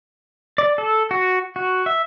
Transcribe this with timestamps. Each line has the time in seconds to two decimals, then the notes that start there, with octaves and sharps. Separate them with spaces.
0.58 D5
0.78 A4
1.11 F#4
1.56 F#4
1.86 E5